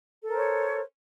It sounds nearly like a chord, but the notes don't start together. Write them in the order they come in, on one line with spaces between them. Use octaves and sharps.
A4 A#4 C5 C#5